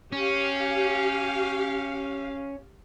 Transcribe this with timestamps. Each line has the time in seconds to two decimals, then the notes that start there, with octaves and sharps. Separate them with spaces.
0.12 C#4 G4 F5